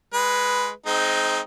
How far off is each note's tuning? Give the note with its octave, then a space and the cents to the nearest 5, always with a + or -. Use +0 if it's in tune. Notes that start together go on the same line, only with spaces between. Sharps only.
G#3 +0 B4 +0
G#3 +35 C4 +0 D#4 +0